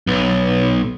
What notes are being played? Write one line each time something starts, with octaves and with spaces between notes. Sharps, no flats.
B1